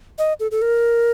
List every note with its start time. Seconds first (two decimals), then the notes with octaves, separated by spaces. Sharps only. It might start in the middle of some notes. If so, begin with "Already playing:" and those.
0.18 D#5
0.40 A4
0.51 A4
0.62 A#4